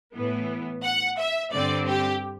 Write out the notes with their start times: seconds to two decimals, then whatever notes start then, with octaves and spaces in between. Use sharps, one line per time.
0.15 A2 E3 B3
0.83 F#5
1.19 E5
1.53 G2 D3 G3 C4 D5
1.87 G4